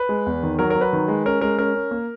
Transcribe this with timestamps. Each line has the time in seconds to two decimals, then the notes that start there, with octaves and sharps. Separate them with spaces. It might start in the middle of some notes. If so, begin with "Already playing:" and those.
Already playing: B4
0.09 G#3
0.26 E2
0.43 D#3
0.59 F#3 A#4
0.70 F#3 A#4
0.81 B4
0.93 D#3
1.08 G#3
1.25 C#4 A#4
1.41 G#3 A#4
1.59 C#4 A#4
1.75 C#4
1.91 A#3